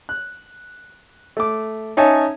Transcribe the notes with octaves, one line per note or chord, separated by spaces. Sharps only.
F#6
A3 D6
C#4 D#4 C#5 E5 G#5 A5